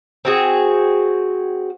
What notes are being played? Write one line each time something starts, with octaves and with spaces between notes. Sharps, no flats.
C4 F#4 G#4